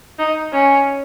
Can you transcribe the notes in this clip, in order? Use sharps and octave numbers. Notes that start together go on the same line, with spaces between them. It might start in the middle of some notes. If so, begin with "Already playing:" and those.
D#4
C#4